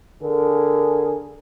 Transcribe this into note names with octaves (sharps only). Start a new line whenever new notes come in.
D3 G#4 A#4